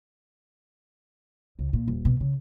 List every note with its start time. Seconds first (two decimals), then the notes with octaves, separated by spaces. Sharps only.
1.59 C#2
1.73 A#2
1.88 D#1
2.05 B2
2.20 C#3